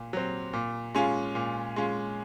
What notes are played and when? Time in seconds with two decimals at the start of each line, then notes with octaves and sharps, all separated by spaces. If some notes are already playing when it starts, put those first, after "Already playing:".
Already playing: A#2
0.13 F#3 C4
0.53 A#2
0.95 G#3 C#4 F4
1.35 A#2
1.76 G#3 C#4 F4